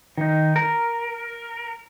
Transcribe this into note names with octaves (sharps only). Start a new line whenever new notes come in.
D#3 D#4
A#4